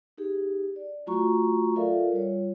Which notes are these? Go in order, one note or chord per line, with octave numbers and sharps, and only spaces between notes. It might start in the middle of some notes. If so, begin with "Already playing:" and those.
D#4 G4 G#4
D5
F#3 A3 F4 F#4 A#5 C#6
F4 A4 A#4 D5 E5 F5
G3 F4 C#5